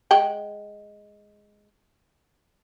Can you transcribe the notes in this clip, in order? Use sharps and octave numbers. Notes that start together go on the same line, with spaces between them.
G#3 F#5 G5